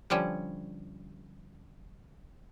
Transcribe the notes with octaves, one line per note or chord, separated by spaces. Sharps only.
D3 F3 G3 C#4